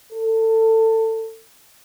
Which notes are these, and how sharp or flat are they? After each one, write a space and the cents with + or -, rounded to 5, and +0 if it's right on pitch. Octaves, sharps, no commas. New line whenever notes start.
A4 +25